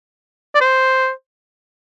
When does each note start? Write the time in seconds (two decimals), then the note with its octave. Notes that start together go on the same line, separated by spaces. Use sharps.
0.55 D5
0.60 C5